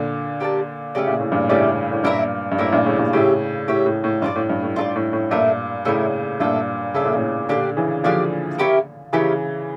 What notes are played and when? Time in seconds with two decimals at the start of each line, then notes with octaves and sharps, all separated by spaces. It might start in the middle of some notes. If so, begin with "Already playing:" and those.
Already playing: A#2 D3
0.40 G4 A#4 D5 A5
0.95 C#3 A3 C#4 G4 D5
1.08 A#2
1.20 A2
1.32 G2 A#2
1.49 A2 C#3 A3 C#4 G4 D5
1.92 A2
2.03 G2 A#2 A#3 E4 A#4 E5
2.52 G2
2.58 A2 A#3 E4 A#4 E5
2.72 G2 A#2
2.86 A2 C#3
2.99 G2 A#2
3.13 A2 C#3 G4 C#5 E5
3.68 A2 G4 C#5 E5
3.86 A2
4.04 A2
4.22 G2 F4 A4 D5
4.36 A2
4.49 G2
4.63 A2
4.76 G2 F4 A4 D5
4.96 A2
5.13 A2
5.31 G2 A#2 A3 E4 A#4
5.85 A2 C#3 A3 E4 A#4
6.40 G2 A#2 A3 D4 A4 E5
6.94 C#3 A3 D4 A4 E5
7.05 A#2
7.15 A2 C#3
7.49 A#2 D3 D4 G4 D5 F5
7.76 C#3 E3
8.04 D3 F3 D4 G4 D5 F5
8.58 C#4 E4 G4 A#4
9.13 C#3 E3 C#4 E4 G4 A#4